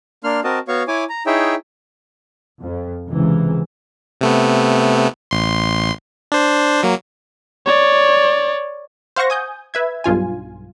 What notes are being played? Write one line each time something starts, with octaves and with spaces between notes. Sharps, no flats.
A#3 D4 C6 F6
C4 F#4 A#4 D#5 A5
B3 F#4 C#5 F5 C#6
E4 C#5 G#5 D6
A#5
D#4 E4 G#4 C#5 E5 G5
F2
C#2 C3 E3
C3 A3 B3
A1 C6
D4 C5
F#3 A#3
C#5 D5
C5 F5 F#5 C#6 A#6
G#5 D#6 G6
B4 E5 G#6
B1 G2 F4 G#5